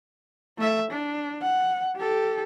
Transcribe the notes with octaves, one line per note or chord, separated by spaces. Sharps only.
A3 E5
D4
F#5
G4 A4